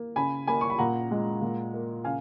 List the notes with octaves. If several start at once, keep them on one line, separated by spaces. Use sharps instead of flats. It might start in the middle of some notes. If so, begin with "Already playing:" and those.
Already playing: A#3
C#3 G#5 B5
A#3 G#5 B5
C#6
B5
A#2 F#5 A#5
G#3
A#2
A#3
C#3 F5 G#5